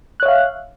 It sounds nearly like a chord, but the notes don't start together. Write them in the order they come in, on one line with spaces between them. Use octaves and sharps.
F#6 C#5 E5 F5